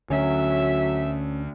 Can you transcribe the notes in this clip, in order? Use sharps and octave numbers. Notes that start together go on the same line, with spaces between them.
D2 D3 F#3 C#4 E5